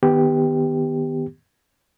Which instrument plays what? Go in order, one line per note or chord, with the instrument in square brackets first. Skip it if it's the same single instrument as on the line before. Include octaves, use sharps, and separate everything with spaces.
[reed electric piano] D#3 B3 G4